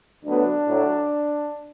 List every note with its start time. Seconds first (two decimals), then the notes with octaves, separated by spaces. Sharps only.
0.24 D2 D3 F#3 B3 D4
0.67 A2 F#3 A3